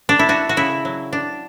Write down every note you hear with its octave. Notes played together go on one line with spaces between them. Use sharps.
D4
E4
D4 F#4
F#4
C#3 E4
F#3
D4